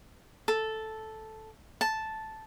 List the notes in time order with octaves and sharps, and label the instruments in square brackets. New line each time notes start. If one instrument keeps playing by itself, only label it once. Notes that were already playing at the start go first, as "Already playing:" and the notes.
[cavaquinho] A4
A5